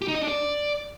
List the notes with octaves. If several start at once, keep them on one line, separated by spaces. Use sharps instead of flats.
G4
D#4
D#5
D4
D5